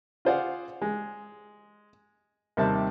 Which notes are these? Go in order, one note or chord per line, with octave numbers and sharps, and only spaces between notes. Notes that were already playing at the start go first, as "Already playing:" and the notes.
F4 G#4 C5 D5 F5 F#5
G#3
D#2 C3 G3 C4 E5 A5